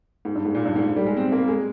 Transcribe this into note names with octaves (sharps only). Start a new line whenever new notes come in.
G#2
G2
G#2
A#2
G2
G#2
G#2
G3
G#3
C4
A#3
G#3